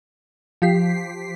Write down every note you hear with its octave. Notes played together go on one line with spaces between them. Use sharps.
F3 G4 B6 C7